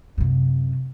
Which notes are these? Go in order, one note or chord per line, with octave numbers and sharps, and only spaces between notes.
F#2 C3